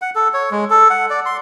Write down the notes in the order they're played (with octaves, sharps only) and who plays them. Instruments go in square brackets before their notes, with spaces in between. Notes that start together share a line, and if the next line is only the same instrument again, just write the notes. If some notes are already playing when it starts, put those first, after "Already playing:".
[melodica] F#5
A4
C#5
G#3
A4
F#5
D5
C6